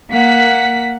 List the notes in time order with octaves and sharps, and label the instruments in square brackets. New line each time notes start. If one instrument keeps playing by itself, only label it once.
[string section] A#3 F#5 B6